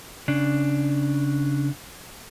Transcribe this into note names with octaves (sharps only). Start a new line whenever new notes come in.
C#3 D4